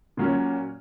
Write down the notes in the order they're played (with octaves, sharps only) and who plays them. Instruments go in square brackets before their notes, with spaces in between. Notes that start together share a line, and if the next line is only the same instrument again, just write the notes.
[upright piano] A#2 F#3 C#4